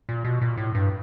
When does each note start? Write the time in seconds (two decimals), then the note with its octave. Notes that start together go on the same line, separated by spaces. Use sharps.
0.09 A#2
0.24 B2
0.41 A#2
0.57 A2
0.75 G2